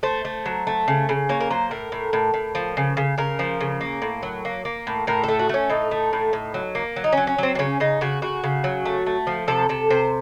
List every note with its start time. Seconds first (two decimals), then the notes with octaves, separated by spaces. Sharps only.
0.03 A3 C5
0.25 A3
0.46 F#3
0.67 A3
0.88 C#3
1.09 C#3
1.29 A#3 C#5
1.40 A#4
1.50 F#3 C5
1.71 A2 A#4
1.92 A2
2.13 A2
2.34 A2
2.55 F3
2.77 C#3
2.97 C#3
3.18 C#3 A#4
3.39 F3
3.61 C#3
3.81 A#3
4.02 A2
4.23 F#3
4.45 A#3
4.65 A#3
4.87 A2
5.07 A2 A#4
5.24 A3 A4
5.39 F#4
5.49 A3 C#4
5.70 A2 D#4
5.91 A3
6.13 A2
6.33 A2
6.54 F#3
6.75 A#3
6.96 F#3
7.04 D#4
7.13 F#3 C#4
7.27 C#4
7.38 F#3 C4
7.55 C4
7.59 C#3 C#4
7.80 C#3 D#4
8.01 C#3 F#4
8.22 C#3 F#4
8.44 C#3
8.64 F#3
8.85 A3
9.06 A3
9.27 F3
9.48 C3 A4
9.69 C3 A4
9.90 C3 C5